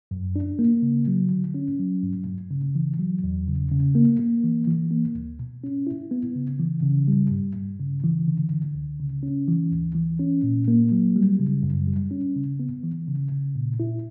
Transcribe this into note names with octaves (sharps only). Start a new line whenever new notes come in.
F#2
D4
A#3
C#3
F#3
D3
C#4
F#3
G2
G2
C#3
E3
F#3
E2
C#3
C#3
A#3
A#3
E3
E3
A#3
D2
B2
C#4
E4
B3
C#3
E3
C#3
G3
G2
G2
C#3
E3
D3
D3
C#2
C#3
C#4
E3
D2
E3
C#4
A#2
A#3
F#3
G3
C#3
F#2
G3
C#4
C#3
B3
E3
C#3
C#3
A#2
E4